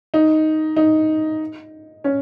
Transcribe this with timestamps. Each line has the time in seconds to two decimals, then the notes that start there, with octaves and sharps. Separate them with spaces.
0.14 D#4
0.76 D#4
2.04 C#4